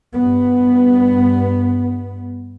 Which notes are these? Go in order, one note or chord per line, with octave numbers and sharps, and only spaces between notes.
G2 B3